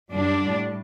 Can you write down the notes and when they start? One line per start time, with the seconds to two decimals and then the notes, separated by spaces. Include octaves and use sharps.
0.13 F#2 D3 G3 D4
0.44 A2 G3